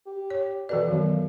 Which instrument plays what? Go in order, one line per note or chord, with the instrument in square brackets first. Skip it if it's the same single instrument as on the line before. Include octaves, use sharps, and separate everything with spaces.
[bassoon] G4
[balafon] C#5
[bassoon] B2 [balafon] E3 A4 D5
[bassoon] F#2 [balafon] D#3 F#3 B3